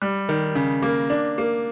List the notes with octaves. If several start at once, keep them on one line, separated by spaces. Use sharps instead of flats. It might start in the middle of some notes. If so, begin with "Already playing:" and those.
G3
D#3
C#3
A#3
D4
A#3